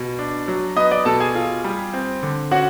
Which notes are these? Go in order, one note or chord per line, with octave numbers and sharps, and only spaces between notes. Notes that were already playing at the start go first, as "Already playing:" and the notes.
Already playing: B2
D4
F#3
B3 D#5 D#6
D5 D6
B2 A4 A5
G#4 G#5
F4
G3
C4
D3
C#4 F#4 F#5